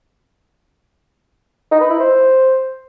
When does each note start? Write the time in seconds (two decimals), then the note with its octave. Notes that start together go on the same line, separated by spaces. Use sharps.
1.71 D#4
1.81 B4
1.90 E4
1.99 C5